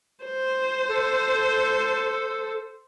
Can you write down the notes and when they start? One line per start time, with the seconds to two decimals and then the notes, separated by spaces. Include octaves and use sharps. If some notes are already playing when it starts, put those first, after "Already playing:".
0.25 C5
0.89 A4